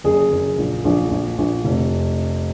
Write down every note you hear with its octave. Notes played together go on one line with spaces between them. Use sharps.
F#1 G#4
F#1
A#1
A#1
A#1
A#1
F1